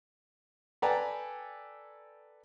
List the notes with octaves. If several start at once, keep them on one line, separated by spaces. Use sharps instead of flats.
A4 B4 D5 G5 G#5 A#5